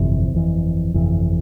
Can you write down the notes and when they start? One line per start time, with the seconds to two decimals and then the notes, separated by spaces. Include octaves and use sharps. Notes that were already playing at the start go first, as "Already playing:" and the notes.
Already playing: G1 F2 C3 E3
0.32 G1 F2 C3 E3
0.94 G1 F2 C3 E3